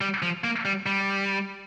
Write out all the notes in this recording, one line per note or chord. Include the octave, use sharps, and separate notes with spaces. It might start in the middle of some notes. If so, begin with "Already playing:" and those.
G3
F3
A#3
G3
G3